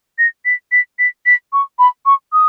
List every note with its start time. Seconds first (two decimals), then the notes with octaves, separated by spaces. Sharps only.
0.18 A#6
0.45 B6
0.72 B6
0.99 B6
1.26 B6
1.53 C#6
1.79 B5
2.06 C#6
2.33 D#6